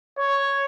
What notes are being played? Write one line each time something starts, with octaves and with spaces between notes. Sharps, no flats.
C#5